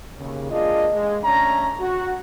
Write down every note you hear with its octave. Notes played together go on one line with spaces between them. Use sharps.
D#2 C#3
G#3 A#3 D4 F4 G#4 D#5
G#3
D3 A3 C#4 D4 A#5
F#4